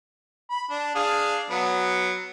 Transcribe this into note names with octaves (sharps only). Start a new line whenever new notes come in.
B5
D4
D4 G#4 F5
F#3 B3